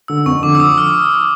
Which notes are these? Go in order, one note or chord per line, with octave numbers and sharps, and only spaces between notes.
D3 E6
F2 C#6
D3 D6
E6
F3 D#6
F6